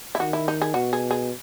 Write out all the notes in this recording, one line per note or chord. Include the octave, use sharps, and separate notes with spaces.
E4
D#3 F#4
E4
D#4
G#4
B2 F#4
G#4
G#4